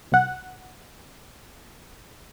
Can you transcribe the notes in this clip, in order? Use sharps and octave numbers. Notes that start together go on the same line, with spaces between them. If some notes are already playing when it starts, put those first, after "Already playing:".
C2 F#5